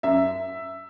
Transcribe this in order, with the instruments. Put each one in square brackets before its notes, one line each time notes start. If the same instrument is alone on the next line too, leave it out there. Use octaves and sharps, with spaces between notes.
[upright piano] F#2 E5